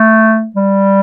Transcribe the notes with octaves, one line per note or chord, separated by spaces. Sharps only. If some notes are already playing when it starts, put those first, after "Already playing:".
Already playing: A3
G3